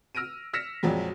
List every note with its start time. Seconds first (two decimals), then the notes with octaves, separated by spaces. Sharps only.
0.15 E6 F6 A#6 D7 D#7
0.53 E6 F6 A#6 B6 C#7 E7
0.83 A#1 F2 F3 F#3 G#3